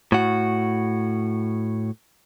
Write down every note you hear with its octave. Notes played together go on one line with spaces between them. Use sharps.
A2 F#4